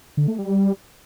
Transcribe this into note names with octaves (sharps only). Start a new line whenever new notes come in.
D3
A3
G3